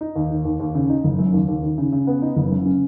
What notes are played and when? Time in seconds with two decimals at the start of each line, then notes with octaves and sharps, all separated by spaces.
0.01 D#4
0.16 D#2
0.31 D#3
0.45 D#2
0.60 D#2
0.75 C#3
0.89 D#4
1.04 F#1
1.19 F#2
1.34 D#2
1.48 D#2
1.63 D#3
1.78 C#3
1.92 C#3
2.07 B3
2.22 D#4
2.36 F#1
2.52 F#2
2.66 C#4